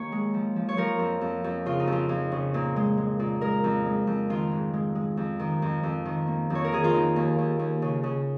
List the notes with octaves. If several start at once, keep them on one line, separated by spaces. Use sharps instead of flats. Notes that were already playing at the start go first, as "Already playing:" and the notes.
Already playing: D#2 A#3 C#5
G#3
F3
F3
C#5
F3 A#4
F2
F2
F2
C#3 F4
D#4
F2
F4
F2
C#3
A#2
G#3
G#3
A#2
G#3 A#4
F2
G#3
F2
D#3 F4
G#2
G#3
G#3
F2
D#3
F2
F2
D#3
A#3
F2
C#5
A#4
D#3 G#4
F4
D#3 D#4
D#2
D#2
D#2
C#3
C#3